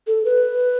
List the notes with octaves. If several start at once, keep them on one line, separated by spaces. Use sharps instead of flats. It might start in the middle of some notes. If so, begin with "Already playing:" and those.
A4
B4